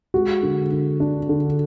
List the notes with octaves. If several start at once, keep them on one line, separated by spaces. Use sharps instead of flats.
G#3 F#4
D3
D3
D4
D3